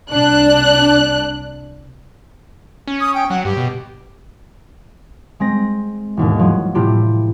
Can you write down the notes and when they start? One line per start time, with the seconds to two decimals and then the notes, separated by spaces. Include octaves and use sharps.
0.11 C2 D4 F#6
2.87 C#4
3.01 D#6
3.14 G5
3.30 F#3 F#5
3.45 G2 G4
3.57 B2
5.40 G#3 C4 A#6
6.17 E1 D#2 G#2
6.39 F3 F#3
6.75 A2 C3 A3 E4 F4 G4